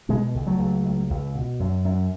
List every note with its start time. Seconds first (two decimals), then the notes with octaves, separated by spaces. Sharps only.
0.09 B2 G#3 B3
0.35 C#2
0.47 F#3 A3
0.59 C#2
0.85 C#2
1.10 C#2
1.35 B2
1.60 F#2
1.85 F#2